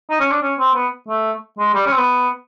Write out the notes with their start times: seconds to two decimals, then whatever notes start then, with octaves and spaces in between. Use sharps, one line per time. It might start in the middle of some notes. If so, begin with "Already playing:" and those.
0.10 D#4
0.20 C#4
0.31 D4
0.42 C#4
0.59 C4
0.75 B3
1.09 A3
1.59 G#3
1.74 G3
1.86 C#4
1.93 C4
1.98 B3